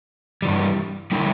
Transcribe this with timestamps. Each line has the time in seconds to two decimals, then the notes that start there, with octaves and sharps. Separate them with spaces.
0.42 G2 E3 G3
1.12 D3 G3 E4